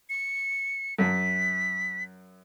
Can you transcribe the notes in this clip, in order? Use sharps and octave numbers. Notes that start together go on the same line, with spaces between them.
C#7
F#2 B6